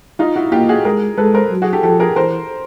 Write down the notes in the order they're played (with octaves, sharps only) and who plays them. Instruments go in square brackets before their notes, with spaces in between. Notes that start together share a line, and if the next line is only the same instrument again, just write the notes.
[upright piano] D#4 F4
E4 F#4
[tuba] A#3 [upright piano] F4 G4
[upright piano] F#4 G#4
[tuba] G#3 [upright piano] G#4 A#4
[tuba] G#3 [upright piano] A4 B4
[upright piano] A#4 C5
[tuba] F#3
[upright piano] F#4 G#4
G4 A4
[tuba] F3 [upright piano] G4 A4
[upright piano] G#4 A#4
[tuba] E3 [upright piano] A#4 C5